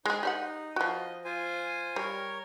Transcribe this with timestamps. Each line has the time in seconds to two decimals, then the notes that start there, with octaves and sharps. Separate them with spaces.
0.06 G#3 D#4 G#4 C5
0.23 D#4 G4 D5 F#5
0.76 F3 F#4 D#5
1.25 F4 C5 G#5
1.96 G3 A#4 C#5